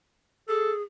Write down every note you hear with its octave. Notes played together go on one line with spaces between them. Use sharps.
G#4 A4